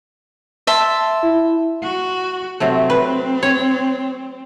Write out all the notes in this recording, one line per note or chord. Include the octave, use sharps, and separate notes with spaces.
E5 A5 C6
E4
F#4
C3 F#3 A3 C4
B4
C#5